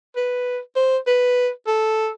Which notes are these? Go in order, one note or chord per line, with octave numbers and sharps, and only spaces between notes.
B4
C5
B4
A4